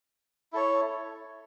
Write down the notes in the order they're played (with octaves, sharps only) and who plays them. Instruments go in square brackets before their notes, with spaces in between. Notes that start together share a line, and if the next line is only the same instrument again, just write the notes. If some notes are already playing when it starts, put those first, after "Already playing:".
[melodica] E4 A4 C#5